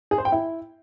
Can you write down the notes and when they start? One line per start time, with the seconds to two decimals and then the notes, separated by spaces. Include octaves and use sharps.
0.11 G#4
0.18 C5
0.25 G5
0.32 E4